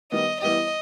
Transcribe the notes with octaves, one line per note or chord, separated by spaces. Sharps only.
D#3 G3 B3 D#5
E3 G3 B3 E4 G4 D#5